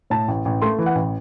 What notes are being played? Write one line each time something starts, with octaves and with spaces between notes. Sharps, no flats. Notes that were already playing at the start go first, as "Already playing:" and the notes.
A2 A5
A1
A1
A3 C6
E3
F#5
A1